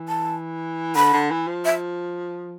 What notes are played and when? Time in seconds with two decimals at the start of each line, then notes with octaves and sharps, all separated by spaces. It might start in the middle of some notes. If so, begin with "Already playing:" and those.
Already playing: E3
0.08 A5
0.96 D3 B5
1.13 D3
1.31 E3
1.47 F3
1.65 E5